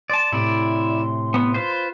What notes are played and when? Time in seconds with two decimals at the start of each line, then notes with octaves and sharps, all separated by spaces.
0.10 D5 A5 C6
0.32 A2 C3 E4 D5
1.34 B3
1.54 F4 B4 C5